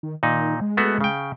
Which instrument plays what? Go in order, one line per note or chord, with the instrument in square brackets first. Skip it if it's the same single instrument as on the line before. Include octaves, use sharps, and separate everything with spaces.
[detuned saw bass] D#3
[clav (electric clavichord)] A#2 D#4 [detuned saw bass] D#3
[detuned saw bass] G#3
[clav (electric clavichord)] A3 B3 F#4
C#3 G5